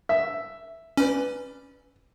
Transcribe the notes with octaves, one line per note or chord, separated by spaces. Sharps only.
E5
C#4 B4 D5